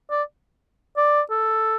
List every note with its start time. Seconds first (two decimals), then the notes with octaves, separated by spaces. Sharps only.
0.11 D5
0.97 D5
1.30 A4